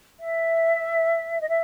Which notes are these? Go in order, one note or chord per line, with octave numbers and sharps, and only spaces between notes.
E5
D#5
E5